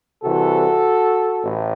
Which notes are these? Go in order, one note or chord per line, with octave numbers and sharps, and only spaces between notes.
C2 C3 E3 F#4 A4
A1 A2